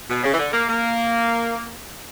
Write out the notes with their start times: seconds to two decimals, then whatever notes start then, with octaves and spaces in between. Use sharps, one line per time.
0.09 B2
0.24 C#3
0.34 E3
0.39 D3
0.53 A#3
0.68 A#3